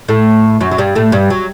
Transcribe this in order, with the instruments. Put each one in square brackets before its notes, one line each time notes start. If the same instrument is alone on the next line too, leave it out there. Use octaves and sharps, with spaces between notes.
[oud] A2 A3
F#2 F#3
F#3
G2 G3
A2 A3
G2 G3
F#3